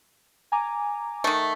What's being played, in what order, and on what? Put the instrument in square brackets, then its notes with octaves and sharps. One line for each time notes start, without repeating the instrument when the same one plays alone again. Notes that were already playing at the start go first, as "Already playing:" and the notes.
[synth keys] G#5 A#5 D6
[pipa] D#3 A3